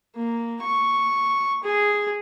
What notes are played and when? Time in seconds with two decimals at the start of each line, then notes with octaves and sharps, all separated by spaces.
0.16 A#3
0.62 C#6
1.63 G#4